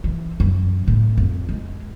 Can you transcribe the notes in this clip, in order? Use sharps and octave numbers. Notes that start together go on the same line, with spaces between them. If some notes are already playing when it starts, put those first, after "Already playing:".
E3
F#2
A2
F2
G#3